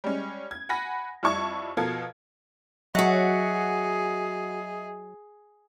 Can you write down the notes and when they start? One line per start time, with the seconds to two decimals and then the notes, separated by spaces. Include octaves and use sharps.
0.04 G3 G#3 C#4
0.51 G#6
0.69 F#5 G#5 B5 A#6
1.23 F2 G3 E4 A5 C#6 G#6
1.77 B2 F3 A4 A#4 F5 G#6
2.95 F#3 F#4 G#4 D#5 E5 F#5